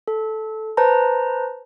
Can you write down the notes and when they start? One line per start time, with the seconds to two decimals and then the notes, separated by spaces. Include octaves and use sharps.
0.08 A4
0.77 B4 C5 A5 A#5